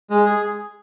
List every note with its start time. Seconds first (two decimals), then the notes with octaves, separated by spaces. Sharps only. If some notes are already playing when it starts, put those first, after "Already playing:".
0.10 G#3
0.26 G#4